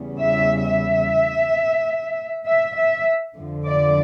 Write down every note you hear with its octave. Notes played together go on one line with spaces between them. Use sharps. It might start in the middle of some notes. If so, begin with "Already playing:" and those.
Already playing: E2 C#3 G3
E5
E5
E5
E5
F2 D3 F3
D5